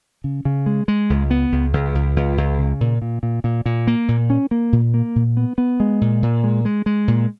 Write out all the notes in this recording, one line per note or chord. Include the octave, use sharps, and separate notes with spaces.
C#3
C#3
G#3
G#3
C#2
B3
C#2
C#2
C#2
C#2
C#2
C#3
A#2
A#2
A#2
A#2
A#2
A#3
A#2
C#4
A#3
A#2
A#3
A#2
B3
B3
G#3
A#2
A#2
G#3
G#3
G#3
A#2